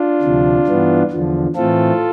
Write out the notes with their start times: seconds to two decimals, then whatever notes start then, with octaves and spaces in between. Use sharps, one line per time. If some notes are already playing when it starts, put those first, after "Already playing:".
Already playing: D4 F4
0.22 D2 C3 F3
0.67 G2 E3 B3
1.11 E2 D3 F3
1.56 A2 E3 A3 C4 F4 A4